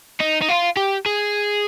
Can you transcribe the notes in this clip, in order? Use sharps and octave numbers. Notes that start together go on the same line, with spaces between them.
D#4
D#4
F4
G4
G#4